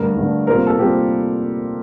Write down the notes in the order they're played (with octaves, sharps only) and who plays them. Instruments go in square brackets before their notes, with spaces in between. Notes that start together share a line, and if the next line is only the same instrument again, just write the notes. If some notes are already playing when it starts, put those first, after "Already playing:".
Already playing: [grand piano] G2 D3 A3 [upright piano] A#4
[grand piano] G2 D3 A3
[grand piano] C3 G3 A#3 F4 C5 [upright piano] A#4
[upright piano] A4
[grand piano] C3 G3 A#3 F4 C5 [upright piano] G4